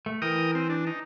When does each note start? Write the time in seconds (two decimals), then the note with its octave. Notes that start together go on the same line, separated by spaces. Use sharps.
0.06 A3
0.22 E3 A#4 G5 D#6
0.55 C4
0.70 D4
0.87 D#4